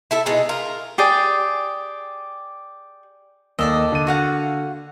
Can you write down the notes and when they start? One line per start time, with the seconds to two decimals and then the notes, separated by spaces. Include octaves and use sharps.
0.11 E4 A4 E5
0.26 B2 G#3 D#4
0.49 F4 A#4
0.98 G4 G#4 D5
3.59 D#2 A4 D5 D#5 E6
3.92 D3 D#7
4.07 F#4 F5 F#5